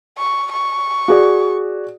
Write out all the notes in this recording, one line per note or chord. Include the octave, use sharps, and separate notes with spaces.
C#6
C#6
F#4 G#4 D5